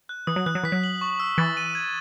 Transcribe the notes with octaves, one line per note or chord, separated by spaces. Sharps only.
F#6
E3 D#6
F#3
E3 F#6
F#3
E3 B6
F#3
F#7
C#6
E6
E3 A6
D#7
G#6